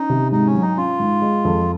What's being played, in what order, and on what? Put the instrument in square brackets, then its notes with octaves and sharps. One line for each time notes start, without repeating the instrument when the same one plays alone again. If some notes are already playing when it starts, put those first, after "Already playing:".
Already playing: [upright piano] C#4 [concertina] D#4
[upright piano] C3
[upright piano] G#2 [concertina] D#4
[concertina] C#4
[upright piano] F#3
[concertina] D#4
[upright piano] C#4 [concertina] F4
[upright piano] G#2
G#3
F2